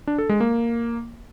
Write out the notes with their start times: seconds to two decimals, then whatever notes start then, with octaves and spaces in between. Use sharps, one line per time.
0.07 D4
0.18 A4
0.29 G#3
0.40 A#3